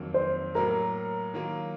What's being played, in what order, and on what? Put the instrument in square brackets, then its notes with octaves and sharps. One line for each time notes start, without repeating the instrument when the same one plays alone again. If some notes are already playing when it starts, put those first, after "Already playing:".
Already playing: [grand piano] F2 D#3 F#3 A#3
[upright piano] C5
[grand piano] A2 F#3 A#3 [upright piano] A#4
[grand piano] D#3 F#3 A#3 F4